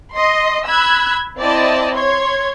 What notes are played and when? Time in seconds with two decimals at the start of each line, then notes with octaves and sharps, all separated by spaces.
0.12 D#5 C6
0.65 B5 E6 F#6 G#6
1.37 C4 E4 D5 D#5 A5
1.95 C#5 C6 G#6